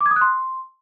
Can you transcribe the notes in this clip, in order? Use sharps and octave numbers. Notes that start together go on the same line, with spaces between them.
D6
G#6
D#6
F#6
C6